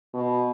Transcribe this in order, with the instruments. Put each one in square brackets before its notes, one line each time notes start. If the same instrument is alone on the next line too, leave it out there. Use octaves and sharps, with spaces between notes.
[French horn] B2